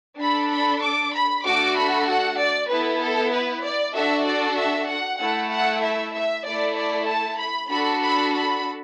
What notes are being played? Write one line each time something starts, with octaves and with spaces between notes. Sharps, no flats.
D4 A4 B5
B5
D6
B5
A3 D4 F#4 A4 D6
B5
F#5
D5
B3 E4 A4 B4
A4
B4
D5
D4 F#4 A4 E5
D5
E5
F#5
A3 E4 A4 F#5
F#5
E5
E5
A3 E4 A4 D5
D5
A5
B5
D4 F#4 A4 B5
B5
B5